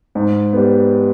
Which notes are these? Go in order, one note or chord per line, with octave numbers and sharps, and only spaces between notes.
G#2
G3 B3